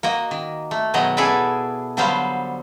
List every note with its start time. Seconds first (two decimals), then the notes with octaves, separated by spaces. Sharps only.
0.03 A#3 F#4 D#5
0.31 D#3
0.71 A3
0.94 B2 D#3 F#3 G#3 D#5
1.17 E4 G#4 A4 B4 D5 E5
1.97 D3 F#3 G3 B3 C5 F5